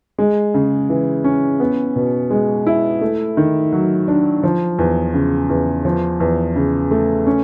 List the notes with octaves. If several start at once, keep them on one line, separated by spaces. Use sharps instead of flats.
G#3
C#3
E3
C#4
B3
B2
G#3
E4
A3
D#3
F#3
D4
F3
E2
C#3
E2
F3
E2
C#3
A3
C#4